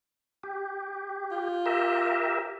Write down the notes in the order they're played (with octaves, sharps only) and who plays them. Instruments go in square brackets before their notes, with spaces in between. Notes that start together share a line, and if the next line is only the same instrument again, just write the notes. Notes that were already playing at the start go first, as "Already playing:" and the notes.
[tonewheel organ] G4
[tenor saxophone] F4
[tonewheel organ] G4 A#4 E5